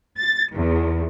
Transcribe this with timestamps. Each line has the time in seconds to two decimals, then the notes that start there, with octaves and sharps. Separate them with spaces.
0.16 A6
0.54 E2